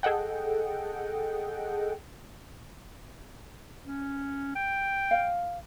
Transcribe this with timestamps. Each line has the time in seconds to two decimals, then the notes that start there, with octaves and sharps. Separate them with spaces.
0.03 G#4 A4 D#5 F#5 G5
3.86 C#4
4.55 G5
5.11 F5